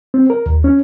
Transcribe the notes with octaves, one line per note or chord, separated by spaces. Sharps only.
C4
A#4
D#2
C#4